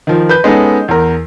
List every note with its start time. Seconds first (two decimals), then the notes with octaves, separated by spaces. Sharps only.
0.07 D#3 F3
0.29 B4 G6
0.44 G#3 B3 C#4 D#4 A4
0.88 E2 A#4